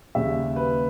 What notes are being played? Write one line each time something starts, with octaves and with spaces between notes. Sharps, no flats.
D#2 C#3 G3 E5
B4